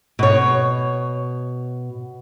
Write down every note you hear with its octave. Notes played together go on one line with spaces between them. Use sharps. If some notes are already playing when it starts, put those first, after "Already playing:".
B2 C#5